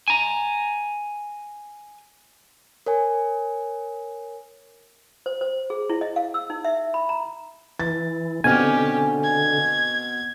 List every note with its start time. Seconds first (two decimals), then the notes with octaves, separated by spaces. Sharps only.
0.08 G#5 A#5
2.86 A#4 C#5 G#5
5.26 C5
5.41 C5
5.70 G#4
5.90 E4
6.01 D#5
6.16 F5
6.34 E6
6.50 D#4
6.65 E5
6.94 B5
7.09 A#5
7.80 E3 A6
8.44 B2 D3 C4 C#4 G4 G#5 F6
9.24 G#6